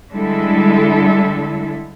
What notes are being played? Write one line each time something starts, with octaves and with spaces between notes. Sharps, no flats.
D3 G3 G#3 E4 A4